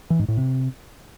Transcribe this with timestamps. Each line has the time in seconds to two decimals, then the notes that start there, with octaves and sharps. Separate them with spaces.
0.10 E3
0.19 G#2
0.28 A2
0.37 C3